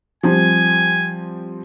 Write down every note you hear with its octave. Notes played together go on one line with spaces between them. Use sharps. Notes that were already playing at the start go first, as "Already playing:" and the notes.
F3 G3 C4 G#5